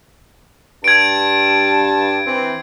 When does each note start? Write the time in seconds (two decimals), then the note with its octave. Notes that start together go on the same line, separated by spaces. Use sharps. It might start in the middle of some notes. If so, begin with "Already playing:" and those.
0.84 G2 A5 G#6 D7
2.26 E3 C4